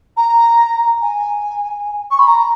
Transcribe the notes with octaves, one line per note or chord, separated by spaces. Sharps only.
A#5
G#5
C#6
B5
A#5